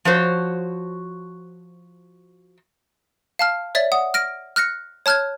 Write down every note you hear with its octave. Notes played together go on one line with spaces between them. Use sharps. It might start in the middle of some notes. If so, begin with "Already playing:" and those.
F3 F#4 C5 C#5
F5 A5 F6
C#5 D5 E5 A6
F#5 D#6
F6 A#6 D7
F6 F#6 A#6 C#7
C#5 A5 F6 F#6 G#6